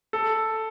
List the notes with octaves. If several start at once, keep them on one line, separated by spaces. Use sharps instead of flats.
A4